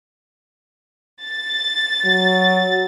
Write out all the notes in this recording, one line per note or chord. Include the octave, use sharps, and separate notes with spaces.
A6
F#3